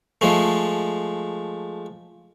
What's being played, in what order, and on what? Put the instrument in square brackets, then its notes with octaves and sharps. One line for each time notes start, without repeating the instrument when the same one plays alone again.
[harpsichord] F3 G#3 A3